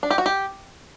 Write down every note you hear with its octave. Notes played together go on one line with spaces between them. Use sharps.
D4
G4
F#4
G4